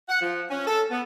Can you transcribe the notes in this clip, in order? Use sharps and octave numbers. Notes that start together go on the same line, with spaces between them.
F#5
F3
C#4
A4
B3